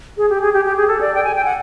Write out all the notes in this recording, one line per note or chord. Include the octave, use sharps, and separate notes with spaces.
G#4
G4
G#4
G4
G4
G#4
A4
D5
G5
G#5
G5
F#5